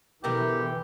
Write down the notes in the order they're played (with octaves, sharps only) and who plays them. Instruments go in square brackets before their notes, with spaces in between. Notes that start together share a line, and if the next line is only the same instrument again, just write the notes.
[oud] B2 D3 A#4 [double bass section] E3 [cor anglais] G4